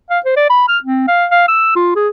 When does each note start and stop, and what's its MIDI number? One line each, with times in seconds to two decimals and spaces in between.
0.10 0.19 77
0.25 0.35 72
0.37 0.48 74
0.50 0.66 83
0.68 0.78 89
0.84 1.04 60
1.08 1.26 77
1.31 1.45 77
1.48 1.74 88
1.76 1.91 65
1.96 2.09 68